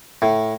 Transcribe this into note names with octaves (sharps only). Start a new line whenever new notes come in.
A2